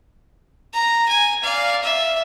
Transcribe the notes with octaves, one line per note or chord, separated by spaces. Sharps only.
A#5
G#5
D5 F5
E5